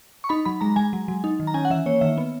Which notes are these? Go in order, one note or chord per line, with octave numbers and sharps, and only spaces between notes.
C#6
D#4 B5
F#3 B5
G#3 A#5
G#3 G#5
F#3
F#3
D#4
D#3
A#5
C#4 G#5
F#5
E3 E5
A#3 C#5
D#3 E5
B3